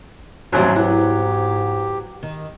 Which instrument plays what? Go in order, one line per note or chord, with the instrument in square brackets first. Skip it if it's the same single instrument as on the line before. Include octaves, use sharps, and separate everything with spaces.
[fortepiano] A1 D#2 F#3 [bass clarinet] G#2 [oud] G3 C4 D4
[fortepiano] F#3 [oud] B3 E4 [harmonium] G4
[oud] D#3